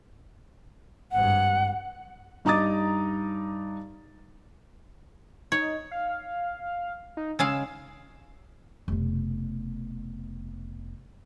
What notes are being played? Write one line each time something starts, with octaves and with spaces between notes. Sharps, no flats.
G#1 G2 F#5
G2 D#4 A#5 D6 D#6 A6
D#4 C#5
F5
D#4
C#3 G#3 F5 E6
F1 B2